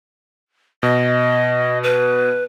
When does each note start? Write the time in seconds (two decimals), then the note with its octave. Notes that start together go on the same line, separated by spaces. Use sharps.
0.83 B2 D#5
1.83 B4